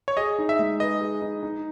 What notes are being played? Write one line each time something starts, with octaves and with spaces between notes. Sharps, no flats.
C#5
G#4 D#5
D#4
E5
G#3
B4 D#5
G#4
D#4
D#4